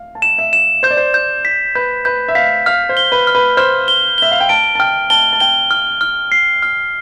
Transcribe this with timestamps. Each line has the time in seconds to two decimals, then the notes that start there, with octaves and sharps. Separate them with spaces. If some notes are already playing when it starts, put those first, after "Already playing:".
Already playing: F5
0.15 A5
0.22 E7
0.38 E5
0.53 E7
0.83 C5 G6
0.90 D5
0.97 C5
1.14 G6
1.45 B6
1.75 B4 G6
2.05 B4 G6
2.28 E5
2.35 F5 B6
2.66 F5 F6
2.89 C5
2.97 G7
3.12 B4
3.27 F6
3.35 B4
3.57 C5 F6
3.88 G7
4.18 E5 G7
4.32 F5
4.41 G5
4.49 A5 D7
4.75 A5
4.79 G5 F6
5.10 A5 G7
5.33 A5
5.40 G5 G7
5.71 F6
6.01 F6
6.32 C7
6.62 F6